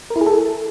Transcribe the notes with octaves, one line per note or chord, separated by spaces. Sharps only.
A#4
E4
G#4
A4